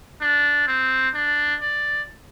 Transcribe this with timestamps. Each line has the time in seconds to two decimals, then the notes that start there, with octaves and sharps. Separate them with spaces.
0.21 D4
0.67 C4
1.14 D4
1.60 D5